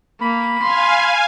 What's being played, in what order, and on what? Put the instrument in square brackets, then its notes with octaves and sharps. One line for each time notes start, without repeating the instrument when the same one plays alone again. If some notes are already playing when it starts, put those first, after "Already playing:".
[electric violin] A#3 [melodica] B5
[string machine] F5 G#5 [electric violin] C6